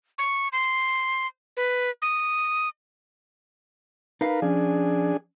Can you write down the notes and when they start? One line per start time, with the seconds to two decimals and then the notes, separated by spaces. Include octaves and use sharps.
0.18 C#6
0.52 C6
1.57 B4
2.02 D#6
4.21 D#4 A#4 B4 F5
4.42 F3 C#4 D4 G#4